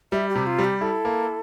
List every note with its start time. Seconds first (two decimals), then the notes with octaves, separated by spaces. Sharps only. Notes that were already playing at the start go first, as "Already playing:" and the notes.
0.12 G3 E5
0.29 G4
0.35 C3
0.47 F4
0.58 G3
0.64 G4
0.81 E4 A4
1.05 A#3